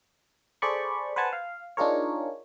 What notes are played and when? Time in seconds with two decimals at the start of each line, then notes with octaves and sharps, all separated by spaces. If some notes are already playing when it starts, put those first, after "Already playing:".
0.62 G#4 A4 C5 D5 B5 C#6
1.16 B4 C5 F#5 G#5 A5
1.33 F5
1.77 D4 D#4 F4 G#4 A#4 C#5